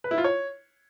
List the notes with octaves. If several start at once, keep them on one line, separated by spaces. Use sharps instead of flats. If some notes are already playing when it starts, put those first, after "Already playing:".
B4
E4
F4
C#5